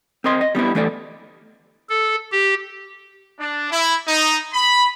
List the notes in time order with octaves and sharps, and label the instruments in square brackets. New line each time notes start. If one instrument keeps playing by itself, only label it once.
[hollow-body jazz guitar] C4 A#4 D#5 C6
D#5
G3 B3 D4 E4
E3 A3 D4 A4 D5
[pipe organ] A4
G4
[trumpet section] D4
E4
D#4
B5